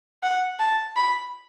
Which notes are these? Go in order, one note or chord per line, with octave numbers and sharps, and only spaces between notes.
F#5
A5
B5